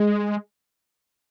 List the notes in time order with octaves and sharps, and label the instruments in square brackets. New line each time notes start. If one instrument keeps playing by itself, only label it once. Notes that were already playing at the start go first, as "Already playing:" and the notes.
Already playing: [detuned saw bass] G#3